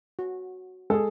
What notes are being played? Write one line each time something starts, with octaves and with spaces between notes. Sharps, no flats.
F#4
G#3 G#4 A4